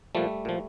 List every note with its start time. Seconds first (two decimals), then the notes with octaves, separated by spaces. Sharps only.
0.15 A#2 F3 G3 A3
0.45 A#2 F3